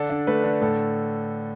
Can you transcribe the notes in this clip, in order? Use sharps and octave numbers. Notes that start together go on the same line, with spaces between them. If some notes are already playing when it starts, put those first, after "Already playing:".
Already playing: D3 D4 A4
D4
A3 B4
D3
A2 A4